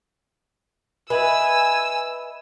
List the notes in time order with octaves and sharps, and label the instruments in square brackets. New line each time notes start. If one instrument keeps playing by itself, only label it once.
[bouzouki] B4 [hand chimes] D#5 E5 B5 [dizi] G#5 [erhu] E6